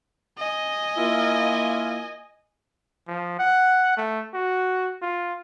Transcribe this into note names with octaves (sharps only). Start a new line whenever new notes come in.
D#5 G#5
A#3 E4 F4
F3
F#5
A3
F#4
F4